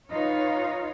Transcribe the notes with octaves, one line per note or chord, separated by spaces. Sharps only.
D#4 F4 B4 C#5 D#5 F5